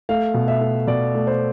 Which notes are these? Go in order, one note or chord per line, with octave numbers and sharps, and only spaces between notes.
A3 F5
B2
E5
A3
B2 D5
A3
C5